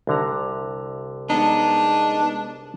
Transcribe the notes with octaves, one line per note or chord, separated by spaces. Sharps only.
C2 D3 A#5
G#3 B3 D4 D#4